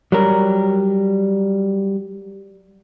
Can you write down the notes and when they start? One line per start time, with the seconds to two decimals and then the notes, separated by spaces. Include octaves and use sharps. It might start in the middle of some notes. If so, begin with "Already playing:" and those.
0.12 F#3 G3 A#4